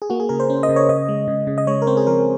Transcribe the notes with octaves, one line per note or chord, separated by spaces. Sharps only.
G#4
A#3 F#4
G#4
C#3 A#4
C5
C#4
D#5
C#3
C#5
C#3 D#5
G#3
C#3
C#3
D#5
G#3 C#5
A#4
C4 C5
G#4
F3 A#4